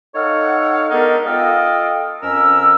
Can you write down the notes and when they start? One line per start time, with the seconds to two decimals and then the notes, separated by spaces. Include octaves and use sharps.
0.15 D#4 A4 C#5 F5 F#5
0.91 G#3 B3 D4 D#4 A#4
1.26 F4 A4 D#5 F5 G5
2.22 F2 C#4 A#4 E6